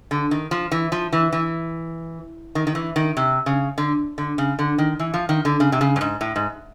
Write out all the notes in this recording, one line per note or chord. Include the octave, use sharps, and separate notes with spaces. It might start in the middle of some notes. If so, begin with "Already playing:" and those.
D3
D#3
F3
E3
F3
E3
E3
D#3
D#3
E3
D#3
C3
C#3
D3
D3
C#3
D3
D#3
E3
F3
D#3
D3
C#3
C3
C#3
G2
G#2
A2
G#2